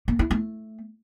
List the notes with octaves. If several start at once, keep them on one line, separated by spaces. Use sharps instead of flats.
A#3
E4
A3